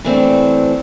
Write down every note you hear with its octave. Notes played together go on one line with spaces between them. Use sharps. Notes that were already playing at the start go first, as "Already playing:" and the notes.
E3 A3 C4 D4